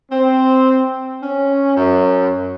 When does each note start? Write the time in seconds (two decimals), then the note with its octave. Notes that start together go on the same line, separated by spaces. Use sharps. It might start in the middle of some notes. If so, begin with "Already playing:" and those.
0.11 C4
1.22 C#4
1.77 F#2